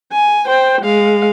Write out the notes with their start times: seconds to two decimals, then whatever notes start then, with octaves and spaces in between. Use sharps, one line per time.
0.13 G#5
0.46 C5 G5
0.81 G#3 F5